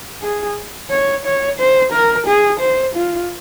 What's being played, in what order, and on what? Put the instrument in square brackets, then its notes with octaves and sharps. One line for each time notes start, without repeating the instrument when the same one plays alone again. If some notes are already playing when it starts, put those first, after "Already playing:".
[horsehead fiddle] G#4
C#5
C#5
C5
A#4
G#4
C5
F4